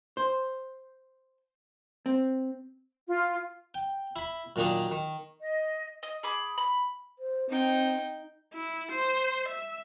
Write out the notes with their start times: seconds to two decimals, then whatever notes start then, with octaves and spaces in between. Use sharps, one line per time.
0.17 C5
2.06 C4
3.08 F4
3.74 G5
4.16 E4 B5
4.56 F#2 A#2 D#3 D4 D#4
4.91 D#3
5.40 D#5
6.03 D#5
6.23 G#4 B5 D6
6.58 B5
7.19 C5
7.50 C4 D#4 G5
8.54 E4
8.91 C5
9.48 E5